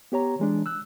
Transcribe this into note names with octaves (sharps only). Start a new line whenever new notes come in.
B3 G4 C#5 A#5
E3 G#3 D4
E6 F#6